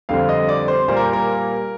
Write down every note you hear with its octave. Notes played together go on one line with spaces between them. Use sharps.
F2 D3 G3 C4 F5
D#5
D5
C5
A#2 G3 A#3 C5
A#4
A#4